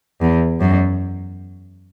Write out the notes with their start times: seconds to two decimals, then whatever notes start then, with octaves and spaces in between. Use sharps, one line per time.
0.21 E2
0.60 F#2